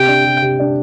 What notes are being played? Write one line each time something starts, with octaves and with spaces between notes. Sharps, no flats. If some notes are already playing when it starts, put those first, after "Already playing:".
Already playing: C3 G5
D4
C3
C3
D4